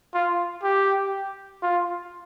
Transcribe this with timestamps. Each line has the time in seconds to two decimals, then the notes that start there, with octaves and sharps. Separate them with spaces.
0.14 F4
0.63 G4
1.63 F4